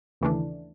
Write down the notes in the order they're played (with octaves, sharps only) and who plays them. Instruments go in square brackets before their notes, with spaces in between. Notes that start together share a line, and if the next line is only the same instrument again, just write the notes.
[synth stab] D#2 C#3 E3 A3 D4